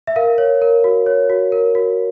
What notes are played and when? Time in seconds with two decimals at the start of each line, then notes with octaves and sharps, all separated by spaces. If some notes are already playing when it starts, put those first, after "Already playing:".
0.07 E5
0.16 A#4 F5
0.38 C#5
0.62 A#4
0.84 F#4
1.06 C#5
1.30 F#4
1.52 A#4
1.75 F#4